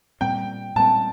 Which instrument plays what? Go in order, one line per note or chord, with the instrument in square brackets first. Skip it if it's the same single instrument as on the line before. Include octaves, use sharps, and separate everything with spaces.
[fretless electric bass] A#2 G3 C4 [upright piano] G5
[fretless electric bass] A#2 G3 C4 [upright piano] A5